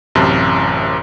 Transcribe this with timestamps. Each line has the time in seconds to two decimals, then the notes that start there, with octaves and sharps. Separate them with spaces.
0.15 A1 F#2 C3 A5